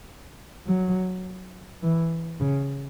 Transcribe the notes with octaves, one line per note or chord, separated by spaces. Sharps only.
F#3
E3
C#3